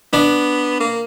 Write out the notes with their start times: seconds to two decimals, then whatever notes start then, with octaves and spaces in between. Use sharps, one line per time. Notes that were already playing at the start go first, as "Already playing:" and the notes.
0.13 B3 D4
0.80 A#3